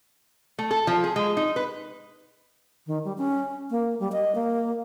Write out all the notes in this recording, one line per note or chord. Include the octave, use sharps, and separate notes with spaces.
A3
A4
F3
G#4
G#3
D#4
B4
D#3
G3
C#4
A#3
G3
D#5
A#3